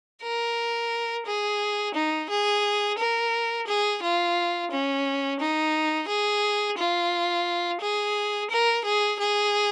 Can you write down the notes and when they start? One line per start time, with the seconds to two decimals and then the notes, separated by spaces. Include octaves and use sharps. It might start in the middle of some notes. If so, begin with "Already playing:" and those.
0.23 A#4
1.26 G#4
1.95 D#4
2.30 G#4
2.98 A#4
3.67 G#4
4.02 F4
4.71 C#4
5.40 D#4
6.08 G#4
6.78 F4
7.81 G#4
8.51 A#4
8.85 G#4
9.19 G#4